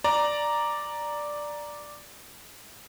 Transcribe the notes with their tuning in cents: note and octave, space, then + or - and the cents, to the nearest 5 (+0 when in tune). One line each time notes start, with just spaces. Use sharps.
D5 +0 A#5 +0